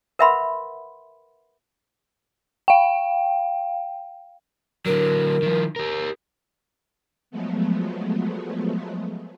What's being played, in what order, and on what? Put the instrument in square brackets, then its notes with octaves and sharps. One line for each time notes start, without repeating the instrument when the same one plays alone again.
[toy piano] A#4 B4 E5 F#5 B5 C6
[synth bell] F5 G5
[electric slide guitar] D3 F#3 [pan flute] A#4
[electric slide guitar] D#3 F3
G4 A#4
[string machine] F3 F#3 G#3 A3 B3